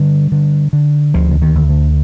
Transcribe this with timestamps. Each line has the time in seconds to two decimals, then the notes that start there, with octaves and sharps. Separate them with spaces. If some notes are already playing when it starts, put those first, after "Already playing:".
Already playing: D3 G3
0.32 D3
0.73 D3
1.14 D2 F3
1.31 D3
1.42 D#3
1.55 D2
1.69 D3